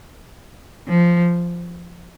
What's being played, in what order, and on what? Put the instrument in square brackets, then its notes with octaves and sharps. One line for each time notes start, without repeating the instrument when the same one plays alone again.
[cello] F3